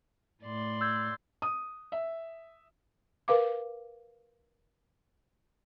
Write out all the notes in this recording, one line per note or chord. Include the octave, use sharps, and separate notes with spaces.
A2 D5 C6
E6 G6 G#6
D#6
E5
A#4 B4 F5 D6